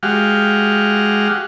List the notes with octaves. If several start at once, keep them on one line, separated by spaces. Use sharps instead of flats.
G#3 F#4 G4 F5